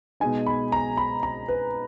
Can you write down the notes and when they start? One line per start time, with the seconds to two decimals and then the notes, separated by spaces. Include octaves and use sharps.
0.20 B2 G#3 D#4 G#5
0.46 B5
0.72 A#5
0.97 B5
1.23 A#5
1.48 B4